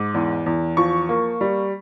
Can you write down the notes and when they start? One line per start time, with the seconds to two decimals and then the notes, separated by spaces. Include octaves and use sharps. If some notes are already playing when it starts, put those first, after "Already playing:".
Already playing: G#2 D6
0.14 E2
0.46 E2
0.77 F3 C#6
1.09 A#3
1.41 G3